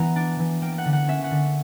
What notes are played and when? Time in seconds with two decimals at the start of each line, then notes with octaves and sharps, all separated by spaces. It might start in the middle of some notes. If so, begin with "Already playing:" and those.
Already playing: E3 B3 F#5 A#5
0.16 D4
0.39 E3
0.62 A#3 G5
0.78 F#5
0.85 D3
0.93 F#5
1.08 C#4 E5
1.24 F#5
1.31 D3